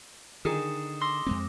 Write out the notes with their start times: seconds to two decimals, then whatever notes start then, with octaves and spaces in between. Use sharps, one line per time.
0.45 D3 D#3 D#4 G#4 D#6 C#7 E7
1.02 C6 D6 E6 A#6
1.27 F2 G#3 C4